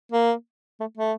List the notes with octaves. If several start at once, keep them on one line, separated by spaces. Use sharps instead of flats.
A#3
A3
A3